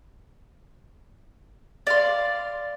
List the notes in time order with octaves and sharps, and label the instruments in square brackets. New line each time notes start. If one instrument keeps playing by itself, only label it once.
[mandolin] D5 F5 C6